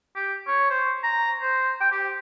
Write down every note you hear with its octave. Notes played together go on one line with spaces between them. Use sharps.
G4
C#5
C5
A#5
C5
G5
G4